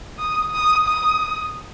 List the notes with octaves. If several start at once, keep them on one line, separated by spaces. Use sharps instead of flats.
D#6
D#6
D#6